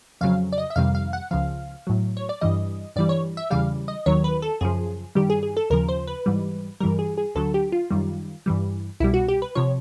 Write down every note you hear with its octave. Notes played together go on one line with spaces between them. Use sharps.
F2 C#3 F#3 F5
D5
D#5
E5
F2 C3 D#3 G3 F5
F5
F#5
C#2 C#3 F3 F5
A2 F#3
C#5
D5
G2 E3 G3 D#5
G2 E3 G3 D5
C#5
E5
E2 C#3 E3 G3 F5
D#5
D#2 D#3 F#3 C#5
B4
A4
F#2 C#3 F3 G#4
G2 D#3 G3 G4
G#4
G#4
A4
D#2 C#3 F3 A#4
C5
B4
G#2 E3 G3
G2 E3 G3 A#4
G#4
G#4
D2 D3 F#3 A4
G4
F4
F#2 D#3 G3
G2 E3 G3
C2 B2 G3 E4
F#4
G4
B4
C3 F3 C#5